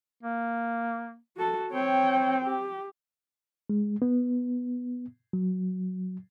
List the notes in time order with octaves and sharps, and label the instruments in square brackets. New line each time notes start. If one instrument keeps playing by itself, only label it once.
[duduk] A#3
[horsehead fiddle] F#4 A4
[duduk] C4 [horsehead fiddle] C#5 G5
[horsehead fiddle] G4
[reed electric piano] G#3
B3
F#3